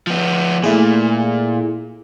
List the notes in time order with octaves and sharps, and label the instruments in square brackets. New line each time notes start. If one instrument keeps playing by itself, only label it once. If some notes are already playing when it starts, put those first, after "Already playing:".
[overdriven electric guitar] F3 B3
[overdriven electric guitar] A#2 [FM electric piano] A3 E4 G#4